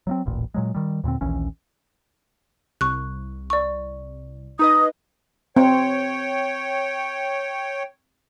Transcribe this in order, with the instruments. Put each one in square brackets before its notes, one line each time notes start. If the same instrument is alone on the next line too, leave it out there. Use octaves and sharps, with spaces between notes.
[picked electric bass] F#3 A3 C4
D#1 A1 A#2
A#2 F#3 G#3
D#3 G3
D#2 A#2 D3 C4
A#1 D#2 E3 C#4
[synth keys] C2 [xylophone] C#6 F#6
[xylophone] D5 C#6
[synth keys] D#4 B4 D#5 [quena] D#6
[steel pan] C4 [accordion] C#5 G5